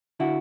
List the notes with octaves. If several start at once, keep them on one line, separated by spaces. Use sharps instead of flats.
D3 E4 F#4